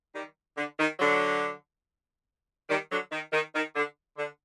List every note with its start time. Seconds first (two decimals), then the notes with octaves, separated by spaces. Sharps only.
0.15 D#3 G3
0.56 D3
0.79 D#3
0.99 D3 F#3
2.69 D#3 G3
2.90 D3 F#3
3.11 D#3
3.32 D#3
3.54 D#3
3.75 D3
4.17 D3